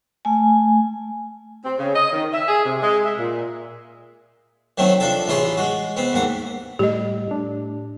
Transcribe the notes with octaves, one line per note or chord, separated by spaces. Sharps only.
A3 G#5
C4
C#3
D#5
D#3
E5
G#4
C3
G#3
E5
A#2
D#3 F#3 A3 C4
F3 D4 A4
A1 E4 F4 G#4 C#5 C6
G#3 F#4
B3 C4
D#2 G#2 F#5
A2 G3 G4 D#5
A2 D4